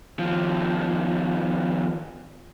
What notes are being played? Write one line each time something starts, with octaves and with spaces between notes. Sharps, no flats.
D#2 F3